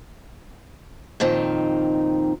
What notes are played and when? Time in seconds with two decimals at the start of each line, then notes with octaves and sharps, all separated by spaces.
1.20 F2 A#2 D#3 C4 D#4